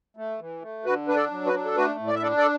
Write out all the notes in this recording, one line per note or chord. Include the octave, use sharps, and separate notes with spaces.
A3
E3
A3
D3 F#4 B4
D4 B4
A4 D5
F#3
F#4 B4
D4
A4
A3 F#4 B4
A2
D5
E5
D4 A4 D5
A4 D5